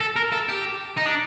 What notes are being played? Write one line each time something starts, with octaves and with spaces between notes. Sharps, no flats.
A4
A#4
A4
G4
D#4
D4